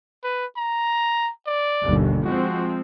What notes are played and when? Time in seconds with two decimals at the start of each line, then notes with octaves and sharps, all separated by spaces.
0.24 B4
0.57 A#5
1.47 D5
1.82 G1 D#2 B2
2.25 F3 G#3 C4 F#4